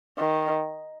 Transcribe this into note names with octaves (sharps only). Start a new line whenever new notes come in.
D#3